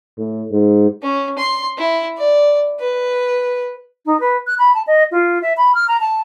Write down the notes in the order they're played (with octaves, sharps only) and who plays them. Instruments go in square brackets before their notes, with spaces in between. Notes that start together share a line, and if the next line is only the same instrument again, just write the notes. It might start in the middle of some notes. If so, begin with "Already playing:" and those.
[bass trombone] A2
G#2
[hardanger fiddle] C#4
C6
E4
D5
B4
[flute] D#4
B4
F#6
B5
A5
D#5
F4
E5
B5
F6
A#5
A5